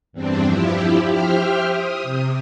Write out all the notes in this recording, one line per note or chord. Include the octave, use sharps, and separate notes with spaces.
E2 G2 C4 D4
F3 E4 G4
G4 C5 E5 G5 F6
D#6
C3